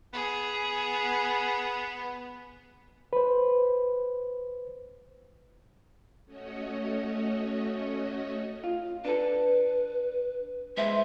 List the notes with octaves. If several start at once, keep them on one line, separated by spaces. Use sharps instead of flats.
B3 G#4
B4 C5
A3 C#4 F#4 C#5 D#5
F4
D4 A4 B4
G#3 B4 C5 E5